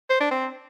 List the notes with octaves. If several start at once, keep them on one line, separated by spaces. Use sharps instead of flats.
C5
D4
C4